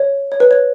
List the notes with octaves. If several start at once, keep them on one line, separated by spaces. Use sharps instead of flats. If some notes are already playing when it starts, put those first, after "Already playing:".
Already playing: C#5
C#5
B4
C#5